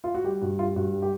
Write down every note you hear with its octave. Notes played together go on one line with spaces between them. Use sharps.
F4
F#4
G3 G4
G2 F#4
G3 F4
G2 F#4
G3
G4